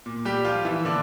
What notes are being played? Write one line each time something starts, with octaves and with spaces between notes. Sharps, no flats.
A#2
G3 G4
F3 F4
E3 E4
A#2 D3 D4